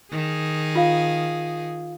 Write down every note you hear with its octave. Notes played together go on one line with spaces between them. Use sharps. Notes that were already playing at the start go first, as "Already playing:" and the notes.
D#3 G#4
F4 F5